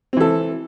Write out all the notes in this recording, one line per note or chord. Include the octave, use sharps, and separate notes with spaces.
E3 C4 A4